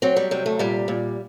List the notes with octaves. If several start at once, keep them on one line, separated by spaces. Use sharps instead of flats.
F#3 C4
G3
C3 G3
A3
A#2 G3
A#2